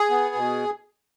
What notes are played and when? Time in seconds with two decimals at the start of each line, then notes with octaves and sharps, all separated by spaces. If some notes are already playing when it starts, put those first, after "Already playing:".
Already playing: G#4
0.10 B3
0.35 B2